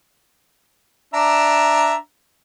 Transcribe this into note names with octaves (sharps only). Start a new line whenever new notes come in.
D4 E5 A#5